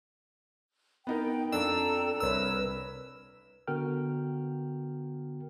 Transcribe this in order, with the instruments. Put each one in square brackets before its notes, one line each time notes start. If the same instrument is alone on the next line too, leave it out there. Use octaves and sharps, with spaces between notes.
[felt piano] B3 D#4 A#4 [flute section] G5
[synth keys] F2 E6 [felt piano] D4 [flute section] A4 G5 A#5
[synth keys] C2 E6 [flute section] A#4 B4 C#5
[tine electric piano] D3 B3 F#4 A#4 G5 F6